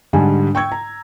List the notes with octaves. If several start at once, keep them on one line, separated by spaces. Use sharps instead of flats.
G#2 D3 G3 D4 G#5
G5 C#6 E6 G#6
A#5